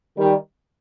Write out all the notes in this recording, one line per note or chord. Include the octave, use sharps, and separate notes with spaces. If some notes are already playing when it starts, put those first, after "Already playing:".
D#3 G3